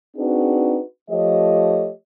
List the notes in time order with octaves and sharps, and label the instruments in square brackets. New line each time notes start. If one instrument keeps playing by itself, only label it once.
[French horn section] C4 D4 D#4 F#4 G#4 B4
F3 A3 G4 C#5 D#5